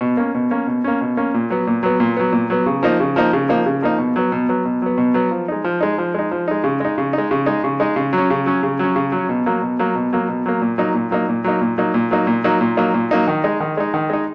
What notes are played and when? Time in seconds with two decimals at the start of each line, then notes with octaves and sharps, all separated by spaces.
0.01 B2
0.17 A#3 C#4
0.35 B2
0.51 A#3 C#4
0.67 B2
0.84 A#3 C#4
1.01 B2
1.17 A#3 C#4
1.34 A#2
1.50 F#3 B3
1.67 A#2
1.83 F#3 B3
2.00 A#2
2.17 F#3 B3
2.32 A#2
2.50 F#3 B3
2.66 C#3
2.83 F3 A#3 D#4
3.00 C#3
3.16 F3 A#3 D#4
3.33 C#3
3.49 F3 A#3 D#4
3.66 C#3
3.82 F3 A#3 D#4
3.98 B2
4.16 F#3 B3
4.32 B2
4.49 F#3 B3
4.65 B2
4.82 F#3 B3
4.98 B2
5.14 F#3 B3
5.31 F3
5.48 G#3 D#4
5.64 F3
5.81 G#3 D#4
5.98 F3
6.14 G#3 D#4
6.31 F3
6.48 G#3 D#4
6.64 C#3
6.80 G#3 D#4
6.98 C#3
7.13 G#3 D#4
7.31 C#3
7.46 G#3 D#4
7.64 C#3
7.80 G#3 D#4
7.96 C#3
8.13 F#3 C#4
8.30 C#3
8.46 F#3 C#4
8.63 C#3
8.79 F#3 C#4
8.96 C#3
9.12 F#3 C#4
9.29 B2
9.46 F#3 A#3
9.62 B2
9.79 F#3 A#3
9.95 B2
10.13 F#3 A#3
10.28 B2
10.46 F#3 A#3
10.61 A#2
10.78 F#3 A#3 D#4
10.94 A#2
11.11 F#3 A#3 D#4
11.29 A#2
11.44 F#3 A#3 D#4
11.61 A#2
11.78 F#3 A#3 D#4
11.94 A#2
12.11 F#3 A#3 D#4
12.27 A#2
12.44 F#3 A#3 D#4
12.61 A#2
12.77 F#3 A#3 D#4
12.94 A#2
13.11 F#3 A#3 D#4
13.28 D#3
13.44 G#3 D#4
13.60 D#3
13.77 G#3 D#4
13.94 D#3
14.10 G#3 D#4